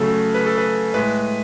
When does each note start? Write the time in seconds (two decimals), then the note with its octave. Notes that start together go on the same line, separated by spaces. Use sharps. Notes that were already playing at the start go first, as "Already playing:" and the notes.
Already playing: C#3 F#3 A3 A4
0.34 B4
0.46 A4
0.58 B4
0.94 A2 G#3 B4